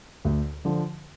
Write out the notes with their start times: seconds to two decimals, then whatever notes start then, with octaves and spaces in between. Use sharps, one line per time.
0.25 D2
0.65 D3 F3